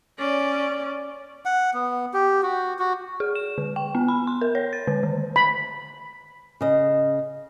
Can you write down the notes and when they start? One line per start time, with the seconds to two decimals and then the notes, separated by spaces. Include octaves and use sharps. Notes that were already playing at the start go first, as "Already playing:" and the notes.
0.19 C#4 D5
1.45 F#5
1.74 B3
2.14 G4
2.43 F#4
2.79 F#4
3.20 G#4
3.35 E7
3.58 D3
3.76 G5
3.95 B3
4.08 B5
4.27 C6
4.41 A#4
4.55 C#5
4.73 A6
4.87 D3
5.03 D#3
5.36 B5
6.61 C#3 D#5